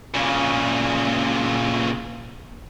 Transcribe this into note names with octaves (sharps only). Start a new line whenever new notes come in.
A#2 C#3